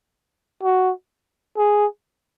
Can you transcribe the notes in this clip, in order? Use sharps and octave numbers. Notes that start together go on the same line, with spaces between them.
F#4
G#4